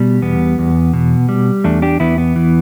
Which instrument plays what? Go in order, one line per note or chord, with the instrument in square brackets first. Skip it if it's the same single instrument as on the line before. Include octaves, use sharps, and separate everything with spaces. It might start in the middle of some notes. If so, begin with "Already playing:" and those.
Already playing: [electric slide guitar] B2 G3
E2 B3
E2
B2
G3
E2 A3 D4
D4 G4
E2 B3 E4
B3
E3